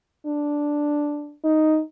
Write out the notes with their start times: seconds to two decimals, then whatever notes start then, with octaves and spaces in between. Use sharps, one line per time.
0.26 D4
1.44 D#4